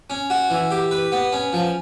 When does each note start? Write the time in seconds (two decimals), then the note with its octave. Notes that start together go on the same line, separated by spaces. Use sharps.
0.10 C#4
0.30 F#4
0.50 E3
0.71 G4
0.91 B4
1.12 B3
1.33 C#4
1.53 F3